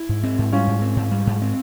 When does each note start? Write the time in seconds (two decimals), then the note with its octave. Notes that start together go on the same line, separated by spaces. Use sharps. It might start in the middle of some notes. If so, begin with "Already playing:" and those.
Already playing: E4
0.09 G#2
0.23 C4
0.39 G#2
0.52 G3 C#4 F4
0.67 G#2
0.82 C4
0.96 G#2
1.11 G3
1.27 G#2
1.42 C4